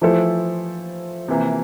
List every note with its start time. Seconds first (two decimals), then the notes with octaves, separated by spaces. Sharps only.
0.01 E3 F3 A3 E4 A4 C5
1.28 C3 E3 A#3